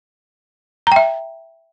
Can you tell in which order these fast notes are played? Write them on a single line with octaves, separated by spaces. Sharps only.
A#5 G5 E5